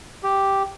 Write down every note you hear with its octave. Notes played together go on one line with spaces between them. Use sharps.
G4